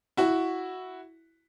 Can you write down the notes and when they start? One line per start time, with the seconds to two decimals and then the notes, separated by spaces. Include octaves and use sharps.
0.17 E4 F#4